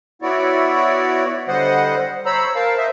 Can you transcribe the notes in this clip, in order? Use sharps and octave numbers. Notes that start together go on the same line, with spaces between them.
B3 E4 F#4 C#5 D5
D3 G3 C5 D#5 F#5
C5 C#5 A#5 B5 E6
A#4 C5 F5 A5
C5 D#5 E5